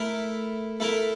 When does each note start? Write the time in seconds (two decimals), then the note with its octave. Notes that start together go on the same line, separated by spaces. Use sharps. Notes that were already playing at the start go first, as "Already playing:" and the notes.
Already playing: A3 E4 A#4
0.80 A3 E4 A#4